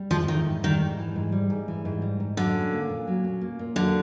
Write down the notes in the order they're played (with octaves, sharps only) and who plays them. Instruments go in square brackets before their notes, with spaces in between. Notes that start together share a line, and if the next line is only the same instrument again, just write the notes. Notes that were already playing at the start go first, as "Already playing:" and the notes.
Already playing: [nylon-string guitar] G3
[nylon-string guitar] G#2 [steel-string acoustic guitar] F3
[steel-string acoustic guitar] D#3 [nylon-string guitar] E3
[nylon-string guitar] G#2
[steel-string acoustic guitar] D#3 [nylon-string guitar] G3
[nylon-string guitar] G#2
E3
G#2
G3
G#2
E3
G#2
G3
G#2
[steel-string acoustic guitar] D3 [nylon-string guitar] F#3
[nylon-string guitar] C#4
A#3
A#2
F#3
C#4
A#3
A#2
[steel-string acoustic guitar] D3 [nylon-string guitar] F#3